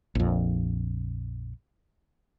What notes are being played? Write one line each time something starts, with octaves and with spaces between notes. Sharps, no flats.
A#1 F2